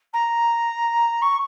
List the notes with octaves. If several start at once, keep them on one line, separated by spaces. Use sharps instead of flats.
A#5
C#6